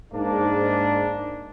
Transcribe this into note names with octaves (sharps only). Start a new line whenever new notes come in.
G#2 A#3 D4